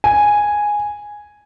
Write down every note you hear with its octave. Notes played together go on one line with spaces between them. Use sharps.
G#5